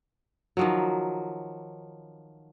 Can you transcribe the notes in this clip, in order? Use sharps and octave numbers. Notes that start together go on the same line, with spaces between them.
D#3 F3 F#3